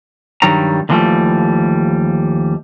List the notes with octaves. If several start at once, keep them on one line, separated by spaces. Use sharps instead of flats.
G2 D#3 F#3 G3 A#5
D#2 D3 E3 F3 G3 A3